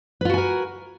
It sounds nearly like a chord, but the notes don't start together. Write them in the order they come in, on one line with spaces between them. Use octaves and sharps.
B4 F4 F#4 G#5 A#4